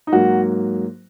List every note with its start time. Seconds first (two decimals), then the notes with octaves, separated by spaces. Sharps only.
0.07 D#4
0.12 G#2 F#3 A#3 F#4